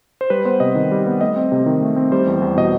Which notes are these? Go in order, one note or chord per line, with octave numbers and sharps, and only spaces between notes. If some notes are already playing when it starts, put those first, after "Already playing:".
C5
G3 B4
B3 C5
C3 D#5
D#3
G3
B3
A3 D#5
C4
C3
D#3
A3
C4
G3 C5
E2
E2
B2 D#5